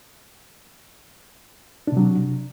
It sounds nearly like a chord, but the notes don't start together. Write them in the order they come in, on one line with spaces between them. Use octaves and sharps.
D4 C3 F#3